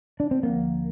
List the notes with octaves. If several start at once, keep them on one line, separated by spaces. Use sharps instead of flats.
D4
C4
D2 D3 F3 A#3